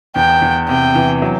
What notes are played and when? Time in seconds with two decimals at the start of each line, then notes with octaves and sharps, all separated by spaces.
0.16 E2 G5
0.42 E2
0.68 C3 G5
0.95 E3
1.22 F#3